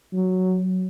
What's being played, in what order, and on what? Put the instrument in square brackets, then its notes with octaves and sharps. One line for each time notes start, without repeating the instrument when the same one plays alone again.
[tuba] F#3